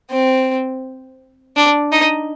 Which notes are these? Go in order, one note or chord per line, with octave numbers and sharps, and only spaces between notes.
C4
D4
D#4